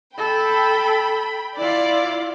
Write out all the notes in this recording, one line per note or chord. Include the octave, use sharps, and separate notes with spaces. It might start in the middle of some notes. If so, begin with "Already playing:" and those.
A4 G5 B5
E4 F4 D5